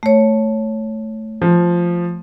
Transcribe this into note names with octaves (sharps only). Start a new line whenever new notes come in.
A3 C#5
F3